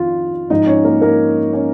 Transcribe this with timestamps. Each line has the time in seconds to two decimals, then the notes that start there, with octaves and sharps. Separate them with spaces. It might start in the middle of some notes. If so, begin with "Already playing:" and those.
Already playing: F2 D#3 F4 F5
0.50 G#2 F3 D#4 D#5
0.67 C#4 C#5
0.84 A#3 A#4
1.02 A#3 A#4
1.53 C#4 C#5